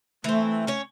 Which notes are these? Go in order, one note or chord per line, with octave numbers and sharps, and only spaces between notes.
E3 A3 C4
C#4 C#5